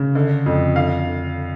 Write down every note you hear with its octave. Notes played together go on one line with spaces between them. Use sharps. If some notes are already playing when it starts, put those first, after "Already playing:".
Already playing: C#3
D3
F2
D3 F5
D3